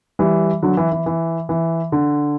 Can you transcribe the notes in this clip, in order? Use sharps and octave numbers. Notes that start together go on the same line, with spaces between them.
E3 G3
D3 F#3
E3
E3
E3
E3
D3